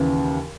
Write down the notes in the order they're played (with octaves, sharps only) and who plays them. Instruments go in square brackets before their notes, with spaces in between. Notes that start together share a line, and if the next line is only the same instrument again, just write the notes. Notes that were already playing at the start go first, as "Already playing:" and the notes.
Already playing: [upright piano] D#2 C#3 E3